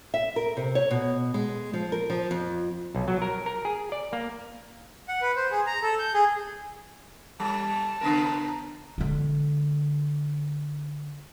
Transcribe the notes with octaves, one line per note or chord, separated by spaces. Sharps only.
E5
A#4
C3
C#5
B2
G#3
F3
A#4
F3
F2
B1
F#3
A#4
A#4
G#4
D5
A#3
F#5
B4
C5
G#4
A#5
A4
G6
G#4
G3 A5
C#3 B3 A#4
D3 G#3